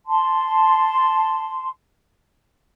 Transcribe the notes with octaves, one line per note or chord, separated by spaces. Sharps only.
A5 C6